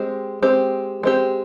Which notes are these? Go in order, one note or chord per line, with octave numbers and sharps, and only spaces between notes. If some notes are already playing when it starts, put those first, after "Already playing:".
Already playing: G#3 C4 G4
G#3 C4 G4
G#3 C4 G4